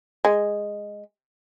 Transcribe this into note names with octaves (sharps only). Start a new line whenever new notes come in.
G#3